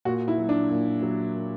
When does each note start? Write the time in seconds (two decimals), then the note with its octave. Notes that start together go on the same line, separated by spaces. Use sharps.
0.05 A#2 F#4
0.28 E4
0.38 F#3
0.49 D4
0.70 A#2
1.02 F#3